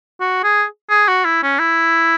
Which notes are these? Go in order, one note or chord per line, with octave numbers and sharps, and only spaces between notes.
F#4
G#4
G#4
F#4
E4
C#4
E4